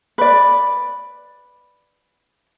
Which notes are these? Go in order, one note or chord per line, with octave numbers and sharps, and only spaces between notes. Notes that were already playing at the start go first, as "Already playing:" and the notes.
B4 D5